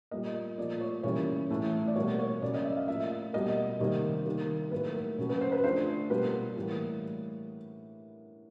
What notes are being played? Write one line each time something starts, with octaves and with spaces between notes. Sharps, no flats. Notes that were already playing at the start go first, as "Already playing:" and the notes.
A#2 G3 A#3 D#5
A#2 F3 A3 D5
C#5
C#3 E3 G3 A#3 C#5
A2 E3 A3
D5
B2 G3 A#3 C#5
C#5
C#3 F#3 A#3 D5
D#5
E5
F5
A2 F3 A#3 E5
B2 G3 A#3 D#5
C3 D#3 G3 A#3
D#3 G3 A#3
A2 F#3 A#3 B4
A#4
C#3 F#3 A#3
B4
C5
B4
D3 F3 A3 C5
B2 G3 A#3 B4
A2 E3 G3 A#3